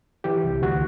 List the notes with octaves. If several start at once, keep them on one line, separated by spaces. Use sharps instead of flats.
E3 G4
C2
D2 F#4